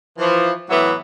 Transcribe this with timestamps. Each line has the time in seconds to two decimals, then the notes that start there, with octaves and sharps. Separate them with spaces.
0.19 E3 F3
0.70 A2 E3 F#3 B3 E5